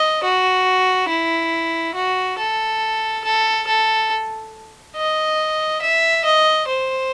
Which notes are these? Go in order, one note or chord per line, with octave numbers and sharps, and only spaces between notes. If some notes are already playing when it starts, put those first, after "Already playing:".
Already playing: D#5
F#4
E4
F#4
A4
A4
A4
D#5
E5
D#5
C5